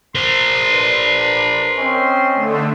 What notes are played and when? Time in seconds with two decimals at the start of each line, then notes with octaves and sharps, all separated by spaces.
0.15 A#4 C5 C6
0.70 D4 B4
1.77 C4 C#4 D#5
2.35 D3 A3